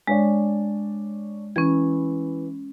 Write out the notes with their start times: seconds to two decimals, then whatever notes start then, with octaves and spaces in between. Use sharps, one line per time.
0.07 G#3 D4 C#5 D5
1.56 E3 C#4 G#6